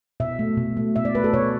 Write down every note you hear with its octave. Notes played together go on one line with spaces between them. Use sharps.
B2 E5
A3
B2
A3
B2 E5
D5
A3 B4
A4
B2 C#5